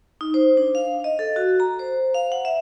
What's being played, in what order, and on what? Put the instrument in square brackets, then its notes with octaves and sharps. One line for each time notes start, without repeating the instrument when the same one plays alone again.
[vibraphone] D#4
C5
D4
F5
D#5
A4
F#4
A#5
C5
F5
F#5
E5